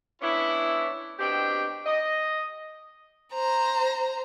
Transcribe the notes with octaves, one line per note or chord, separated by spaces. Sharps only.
B3 C#4 D4 E4
B2 C4 D4 G4 G5
D#5
C5 A#5